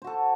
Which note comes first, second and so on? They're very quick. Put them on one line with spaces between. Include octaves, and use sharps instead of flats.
C5 F#4 A4